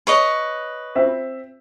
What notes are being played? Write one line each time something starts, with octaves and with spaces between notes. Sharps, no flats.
B4 C#5 D#5
C4 E5